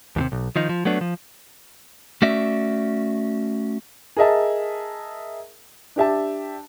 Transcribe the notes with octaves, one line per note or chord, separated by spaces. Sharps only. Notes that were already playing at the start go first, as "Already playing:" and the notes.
D#2 A2 C3
B1
D#3 F3 D#4
F3
F#3 A3 B3 D4
F3
A3 C#4 F#4 D5 E5
G#4 A#4 D#5 E5 A5
D4 G4 E5 A5